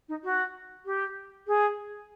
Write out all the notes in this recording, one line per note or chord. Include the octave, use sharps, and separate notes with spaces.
D#4
F#4
G4
G#4